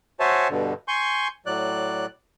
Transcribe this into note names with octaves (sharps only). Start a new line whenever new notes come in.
F#4 C5 C#5 E5 G#5 A5
G2 B2 D3
G#5 C6 C#6 G6
A2 F#3 D5 F#6